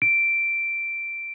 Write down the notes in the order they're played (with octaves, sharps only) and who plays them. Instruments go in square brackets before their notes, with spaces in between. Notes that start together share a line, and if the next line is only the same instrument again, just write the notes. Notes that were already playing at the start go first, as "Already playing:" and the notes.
[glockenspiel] D7